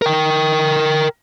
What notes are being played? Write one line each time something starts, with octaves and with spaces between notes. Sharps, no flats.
A#4 G5